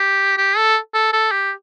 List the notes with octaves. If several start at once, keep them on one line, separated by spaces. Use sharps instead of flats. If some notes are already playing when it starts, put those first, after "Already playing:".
Already playing: G4
G4
A4
A4
A4
G4